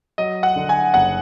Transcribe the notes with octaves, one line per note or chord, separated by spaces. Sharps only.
F#3 D#5
F#5
D3
G#5
F#1 F#5